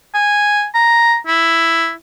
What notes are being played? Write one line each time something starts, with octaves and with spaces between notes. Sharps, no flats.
G#5
A#5
E4